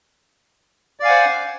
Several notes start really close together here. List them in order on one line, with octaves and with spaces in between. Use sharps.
D5 F5 G#5 F#5 C5